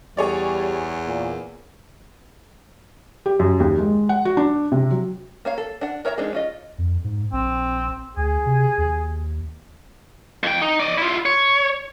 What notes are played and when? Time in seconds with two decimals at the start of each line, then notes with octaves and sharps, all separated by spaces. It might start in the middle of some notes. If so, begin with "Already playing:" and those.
0.17 E2 G3 G#4 C#5 D5
1.06 A#2
3.26 G4
3.39 F#2
3.60 D#2
3.78 G#3
4.09 F#5
4.25 F#4
4.37 D4
4.72 C3
4.91 F#3
5.45 A#3 C#5 F5
5.58 A4
5.81 D4 F#5
6.05 A#4 C#5 E5 F5 A#5
6.17 G#3 C4 D4 D#4 G#4
6.33 C#4 F4 D#5
6.78 F2
7.04 G#2
7.33 A#1 C4
8.17 D2 G#4
8.46 C3
8.78 D#2
10.43 F2 G5
10.62 D#4
10.80 D5 D#5
10.98 E4 F4
11.25 C#5